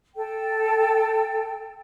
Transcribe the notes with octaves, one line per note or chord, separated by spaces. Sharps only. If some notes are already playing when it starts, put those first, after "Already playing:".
A4 G5